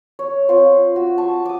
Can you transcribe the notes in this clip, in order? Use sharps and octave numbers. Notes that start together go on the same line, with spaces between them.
C#5
C4 F4 C5
F#4
A5 C#6
D6 D#6